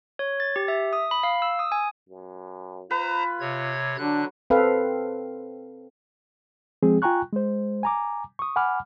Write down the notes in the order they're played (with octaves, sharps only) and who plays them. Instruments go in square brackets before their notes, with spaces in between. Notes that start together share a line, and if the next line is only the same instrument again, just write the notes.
[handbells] C#5
A6
G4
E5
D#6
B5
F5
E6
D#6
G#5
[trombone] F#2
[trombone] F4 [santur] B4 [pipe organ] C5 A#5
[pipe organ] C3 C#5 G#6
[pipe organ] D3 F#6 [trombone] F#3 [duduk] D4
[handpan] C4 A4 B4 F5
[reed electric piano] F3 G#3 C4 G#4
F4 G5 G#5 A#5 C#6 F#6
G#3 C5
G#5 A#5 D6
C#6 D#6
F#5 G#5 B5 D6 F6